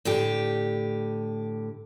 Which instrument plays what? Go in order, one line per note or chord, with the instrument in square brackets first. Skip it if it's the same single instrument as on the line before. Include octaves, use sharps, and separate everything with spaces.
[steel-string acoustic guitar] A2 D3 G4